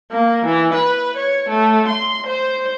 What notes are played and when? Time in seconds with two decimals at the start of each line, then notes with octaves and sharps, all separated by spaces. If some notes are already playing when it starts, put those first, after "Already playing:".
0.11 A#3
0.45 E3
0.74 B4
1.16 C#5
1.48 A3
1.88 C6
2.27 C5